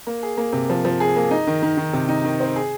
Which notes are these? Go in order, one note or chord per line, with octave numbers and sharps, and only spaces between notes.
A#3
G#4
A#3
C3
F3
F3
G#4
A#3
D#4
D#3
D#3
D#3
C3
D#4
D#3
C4
G#4